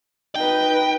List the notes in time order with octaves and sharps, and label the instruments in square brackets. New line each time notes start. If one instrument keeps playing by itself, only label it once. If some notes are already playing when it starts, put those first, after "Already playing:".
[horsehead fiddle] D#4 B4 [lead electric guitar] G5